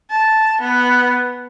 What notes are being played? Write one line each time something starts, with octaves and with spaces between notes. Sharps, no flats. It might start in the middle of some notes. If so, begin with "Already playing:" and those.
A5
B3